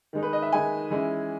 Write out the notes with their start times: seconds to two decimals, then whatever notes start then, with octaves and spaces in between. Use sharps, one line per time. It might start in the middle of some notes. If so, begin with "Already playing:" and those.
0.13 D#3 G#3 D#4
0.23 B4
0.33 D#5
0.42 E5
0.52 D#3 G#3 D#4 G#5
0.91 E3 G#3 C#4 E4